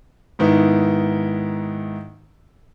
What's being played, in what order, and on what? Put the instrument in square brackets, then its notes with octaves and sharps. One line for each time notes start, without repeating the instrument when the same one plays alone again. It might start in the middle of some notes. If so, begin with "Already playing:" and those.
[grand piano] G#2 D#3 B3 E4